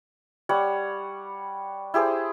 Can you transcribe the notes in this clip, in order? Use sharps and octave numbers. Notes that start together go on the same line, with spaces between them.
G3 C#5 F#5
E4 G4 G#4 C5